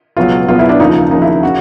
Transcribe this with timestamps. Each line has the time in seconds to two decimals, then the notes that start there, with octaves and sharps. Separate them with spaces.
0.17 C#2 B2 F#3 F4
0.48 C#2 B2 F#3 F4
0.59 E4
0.69 D4
0.80 D#2 C#3 F3 D#4
1.11 D#2 C#3 F3 D#4
1.22 E4
1.43 C#3 F#4